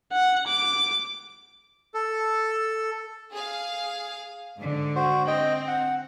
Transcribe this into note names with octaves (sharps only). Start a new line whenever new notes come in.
F#5
D6
A4
G#4 F5
G#2 D3
F#4 C5
C4 D#5 G5
F#5